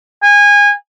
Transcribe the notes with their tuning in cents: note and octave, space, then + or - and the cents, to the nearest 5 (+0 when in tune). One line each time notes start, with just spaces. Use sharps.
G#5 -25